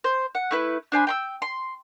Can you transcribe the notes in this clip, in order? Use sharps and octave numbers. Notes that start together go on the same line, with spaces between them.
C5
F#5
A3 E4 B4
D4 C5 G#5 B5
G5 C6 E6
C6